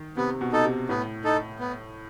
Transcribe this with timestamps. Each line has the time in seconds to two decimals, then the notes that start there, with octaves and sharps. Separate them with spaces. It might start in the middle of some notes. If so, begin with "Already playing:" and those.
Already playing: D#3
0.17 C3 B3
0.41 B2
0.52 D#4 A4
0.65 C3
0.89 A2 B3
1.24 D#4 A4
1.60 B3